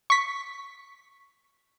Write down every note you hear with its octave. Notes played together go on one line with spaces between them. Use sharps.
C#6 B6